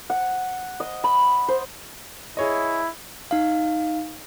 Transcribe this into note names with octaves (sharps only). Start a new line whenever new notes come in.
F#5
D#5
B5
C5
E4 G#4 C#5 D#5
D#4 F5